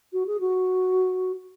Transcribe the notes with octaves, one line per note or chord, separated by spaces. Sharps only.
F#4
G#4
F#4